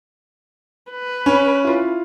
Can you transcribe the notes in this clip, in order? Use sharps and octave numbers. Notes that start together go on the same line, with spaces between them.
B4
C#4 B5
E4 F4